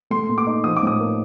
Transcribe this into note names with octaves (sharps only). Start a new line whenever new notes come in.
A3 C6
A#2
D6
D#4
F3 D#6
D6
A2 D#6
A#3